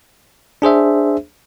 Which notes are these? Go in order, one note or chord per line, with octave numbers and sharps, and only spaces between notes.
D4 G#4 C5 E5